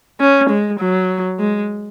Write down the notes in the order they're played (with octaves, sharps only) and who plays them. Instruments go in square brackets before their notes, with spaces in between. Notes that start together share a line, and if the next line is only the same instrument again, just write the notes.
[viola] C#4
G#3
F#3
G#3